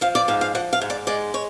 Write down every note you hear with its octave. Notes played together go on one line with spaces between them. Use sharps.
F3 F5
D5
G#2 F5
F5
F3 F#5
F5
G#2
D5
G#3 D5
C#5